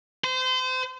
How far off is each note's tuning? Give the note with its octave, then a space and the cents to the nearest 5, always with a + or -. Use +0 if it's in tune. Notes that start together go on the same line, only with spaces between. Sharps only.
C5 -30